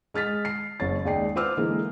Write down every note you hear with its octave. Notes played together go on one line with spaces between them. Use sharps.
G#3 F6 A6 B6
C7
F#1 C#5 A6
D#2 G#3 D5 G5 C7
F4 B4 C5 D6 E6 F6
D3 E3 G#3 A#3